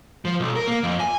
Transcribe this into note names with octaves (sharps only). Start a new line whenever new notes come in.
F3
B1
A#4
A#3
F2
G#5